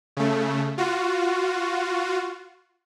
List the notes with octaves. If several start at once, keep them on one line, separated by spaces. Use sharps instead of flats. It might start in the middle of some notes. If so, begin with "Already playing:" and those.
C#3 A3
F4 F#4